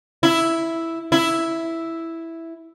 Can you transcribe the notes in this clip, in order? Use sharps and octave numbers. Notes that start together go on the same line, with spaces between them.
E4
E4